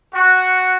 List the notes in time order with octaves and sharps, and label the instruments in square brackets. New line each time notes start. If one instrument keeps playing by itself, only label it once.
[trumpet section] F#4